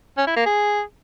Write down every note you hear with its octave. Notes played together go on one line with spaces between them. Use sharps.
C#4
E4
A#3
G#4